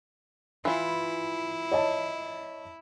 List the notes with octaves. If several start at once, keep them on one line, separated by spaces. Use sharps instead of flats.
E3 E4 F4
C#5 D#5 A5